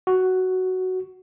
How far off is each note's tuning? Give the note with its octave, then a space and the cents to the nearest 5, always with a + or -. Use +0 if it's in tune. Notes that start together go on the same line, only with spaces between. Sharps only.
F#4 +5